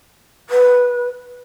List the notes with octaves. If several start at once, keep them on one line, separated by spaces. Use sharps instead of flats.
B4